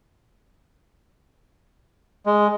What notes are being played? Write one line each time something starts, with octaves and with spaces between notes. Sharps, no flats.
G#3